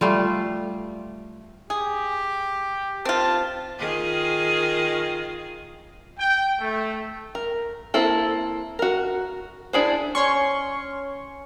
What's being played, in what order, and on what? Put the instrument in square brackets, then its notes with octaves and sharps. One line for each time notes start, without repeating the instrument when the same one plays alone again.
[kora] G3 A3 F4
[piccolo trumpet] G4 [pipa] G#4
[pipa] C4 F4 [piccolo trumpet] A5
[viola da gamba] D#3 F4 G#4
[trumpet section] G5
A3
[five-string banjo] A#4
A#3 C4 E4 A4
F#4 A#4
D4 E4 G#4 C5
[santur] C#4 [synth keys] C#5 C6 C#6